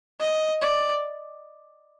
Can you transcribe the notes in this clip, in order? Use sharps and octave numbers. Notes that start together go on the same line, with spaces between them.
D#5
D5